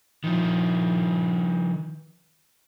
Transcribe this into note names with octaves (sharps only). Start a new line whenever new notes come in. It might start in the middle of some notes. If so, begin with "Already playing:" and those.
D#3 F3